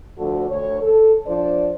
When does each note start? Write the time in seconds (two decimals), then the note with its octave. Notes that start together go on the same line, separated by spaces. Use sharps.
0.18 D2 F3 D4 F#4 A4
0.50 D2 C#5
0.82 A4
1.27 F3 D4 C5 D5